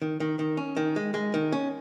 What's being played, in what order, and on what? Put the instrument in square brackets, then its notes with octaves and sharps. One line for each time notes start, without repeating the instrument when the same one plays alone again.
[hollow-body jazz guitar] D#3
D#3
D#3
C#4
D#3
G#3
G#3
D#3
C#4